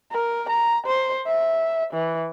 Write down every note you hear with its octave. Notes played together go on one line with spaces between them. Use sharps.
A#4
A#5
C5
E5
E3